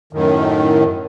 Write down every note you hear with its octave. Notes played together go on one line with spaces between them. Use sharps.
F#2 A2 D#3